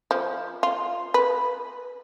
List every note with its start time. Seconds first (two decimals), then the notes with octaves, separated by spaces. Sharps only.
0.11 F3
0.63 F4
1.14 B4